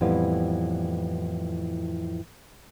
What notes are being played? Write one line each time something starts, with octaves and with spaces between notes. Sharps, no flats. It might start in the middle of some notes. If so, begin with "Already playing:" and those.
F2 A2 E3 G3 B3